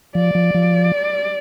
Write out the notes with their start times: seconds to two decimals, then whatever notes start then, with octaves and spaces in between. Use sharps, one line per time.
0.15 F3 D5
0.35 F3
0.55 F3